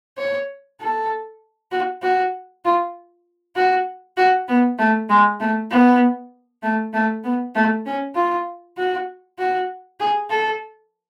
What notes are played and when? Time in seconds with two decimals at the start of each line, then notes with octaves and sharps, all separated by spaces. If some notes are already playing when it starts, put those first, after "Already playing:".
0.18 C#5
0.80 A4
1.71 F#4
2.02 F#4
2.64 F4
3.56 F#4
4.17 F#4
4.48 B3
4.78 A3
5.09 G#3
5.40 A3
5.70 B3
6.63 A3
6.93 A3
7.24 B3
7.55 A3
7.86 C#4
8.15 F4
8.78 F#4
9.39 F#4
10.00 G#4
10.30 A4